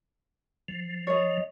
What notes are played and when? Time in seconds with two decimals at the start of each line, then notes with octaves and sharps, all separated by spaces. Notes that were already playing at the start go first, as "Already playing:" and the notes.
0.68 F3
1.07 C#5 D#5